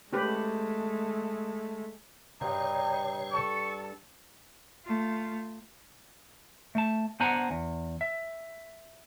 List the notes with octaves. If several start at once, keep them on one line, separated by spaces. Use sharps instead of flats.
G#3 A3 C#4 G4 B4
G2 C3 G3 D#4 C#5
A4 C#6
A3 F4
A3 A5
B3 D4 C5 F#5 G#5 A#5
E2
E5